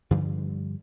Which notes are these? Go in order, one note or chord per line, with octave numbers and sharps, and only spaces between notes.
G2 D3 F3 G3